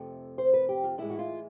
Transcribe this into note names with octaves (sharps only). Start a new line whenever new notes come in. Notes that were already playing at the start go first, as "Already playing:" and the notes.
Already playing: F2 C3 F3 A3
C5
B4
G4
F4
A2 E3 G#3 E4
F#4
F4